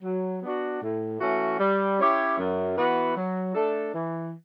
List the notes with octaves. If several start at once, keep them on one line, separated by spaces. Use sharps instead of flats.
F#3
B3 D4 F#4
A2
E3 A3 C#4 F#4
G3
C#4 E4 G4 C#5
F#2
E3 B3 F#4 B4
F#3
A3 D4 A4
E3